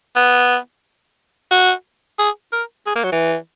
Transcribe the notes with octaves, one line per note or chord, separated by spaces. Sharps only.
B3
F#4
G#4
A#4
G#4
A#3
F#3
E3